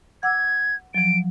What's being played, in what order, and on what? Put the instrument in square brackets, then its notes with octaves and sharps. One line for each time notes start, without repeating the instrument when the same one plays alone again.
[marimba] F#5 D6 E6 [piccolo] G#6
[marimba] F3 F#3 [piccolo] D7